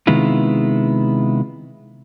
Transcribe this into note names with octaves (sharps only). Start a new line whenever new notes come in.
C3 D#3 G#3 B3 E4 F4